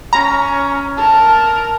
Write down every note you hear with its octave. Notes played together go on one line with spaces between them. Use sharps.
C#4 A#5
A#4 A5